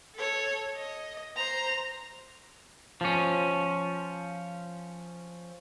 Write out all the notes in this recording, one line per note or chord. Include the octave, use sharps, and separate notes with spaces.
A4 C#5
D#5
C5 A#5
F3 C#4